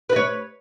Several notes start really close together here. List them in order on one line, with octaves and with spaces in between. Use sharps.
B4 D#5 C#5